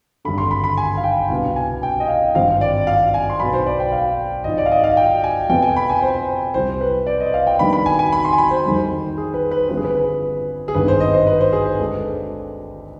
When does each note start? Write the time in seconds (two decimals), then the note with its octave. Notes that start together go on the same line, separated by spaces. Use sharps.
0.25 G#1 G2 D3 B5
0.38 C6
0.51 B5
0.64 B5
0.77 G#5
0.97 F5
1.04 G5
1.30 C2 B2 B3 D4 F5
1.56 G#5
1.83 G5
2.00 D#5
2.08 F5
2.35 G#1 G2 F3 C4 F5
2.61 D5
2.87 F5
3.14 G#5
3.30 C6
3.40 B1 B2 B3 B5
3.54 C5
3.66 D5
3.80 G5
3.92 F5
4.44 G#1 G#2 F3 D#5
4.58 D5
4.66 F5
4.72 D#5
4.84 F5
4.97 G5
5.24 G#5
5.50 F2 C3 F3 B3 G5
5.62 G#5
5.76 B5
5.89 G#5
6.02 C5
6.54 C2 C3 G3 C5
6.81 B4
7.07 D5
7.20 D#5
7.34 F5
7.47 G5
7.59 F2 D#3 G3 B3 D4 B5
7.73 B5
7.86 G#5
7.99 G#5
8.12 B5
8.25 C6
8.33 G#5
8.38 B5
8.51 C5
8.65 F2 D#3 G3 C4
9.18 G#4
9.34 B4
9.51 B4
9.69 G1 G2 F3 C4 B4
9.77 G#4
9.85 B4
9.95 B4
10.68 G#4
10.75 G#1 G2 D#3 B3 B4
10.88 C5
11.00 D#5
11.14 C5
11.27 B4
11.41 C5
11.53 G#4
11.66 B4
11.79 D2 D3 G#3 D4